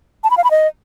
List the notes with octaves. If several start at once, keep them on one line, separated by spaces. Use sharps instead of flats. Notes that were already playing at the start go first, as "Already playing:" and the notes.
A5
B5
F5
B5
D#5